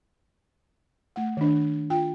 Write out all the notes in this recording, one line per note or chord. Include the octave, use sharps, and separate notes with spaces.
A3 F#5
D#3 D4
F4 G5